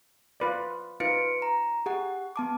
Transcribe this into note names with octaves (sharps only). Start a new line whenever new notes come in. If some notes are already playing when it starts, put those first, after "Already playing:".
F4 B4 D5
D#4 F4 B4 C#7 D7
A#5
G4 G#4 F#5
B3 A5 D6